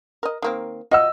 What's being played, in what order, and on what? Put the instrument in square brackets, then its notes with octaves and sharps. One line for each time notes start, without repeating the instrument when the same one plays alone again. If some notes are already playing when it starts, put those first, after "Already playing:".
[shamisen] A#4 D#5
D#3 A#3 C4
[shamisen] F4 F#5 [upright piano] D#5 E6